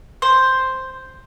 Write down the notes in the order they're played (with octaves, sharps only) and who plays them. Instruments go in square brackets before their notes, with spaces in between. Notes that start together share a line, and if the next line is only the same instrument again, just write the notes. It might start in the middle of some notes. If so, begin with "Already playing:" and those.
[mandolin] C5